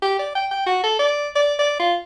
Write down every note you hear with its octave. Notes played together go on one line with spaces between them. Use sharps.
G4
D5
G5
G5
F#4
A4
D5
D5
D5
F4